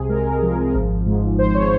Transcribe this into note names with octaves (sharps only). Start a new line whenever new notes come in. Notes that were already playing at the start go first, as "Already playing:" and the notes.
Already playing: C2 C3 G#4
G#3 A#4
F3
G#1
G#2
G#1 C5
C#5